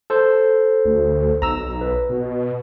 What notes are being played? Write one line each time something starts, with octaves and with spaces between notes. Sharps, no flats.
A4 C5
D2
B1 A#5 E6
B4
B2